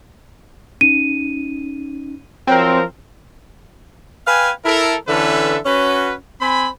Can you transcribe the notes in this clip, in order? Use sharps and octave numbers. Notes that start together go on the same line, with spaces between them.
C#4 D#4 D#7
F3 F#3 C4 A#4
B4 F5 G5 G#5
E4 A4 A#4
D3 E3 C#4 A4 B4 E5
C#4 F#4 B4
C4 C5 G#5 B5